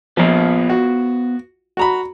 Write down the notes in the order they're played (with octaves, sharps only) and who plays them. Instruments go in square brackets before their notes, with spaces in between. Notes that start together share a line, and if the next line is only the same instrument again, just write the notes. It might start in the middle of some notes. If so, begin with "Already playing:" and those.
[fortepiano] A#1 F3 [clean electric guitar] B3 C5 F5
[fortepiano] F#4
F#4 A#5 B5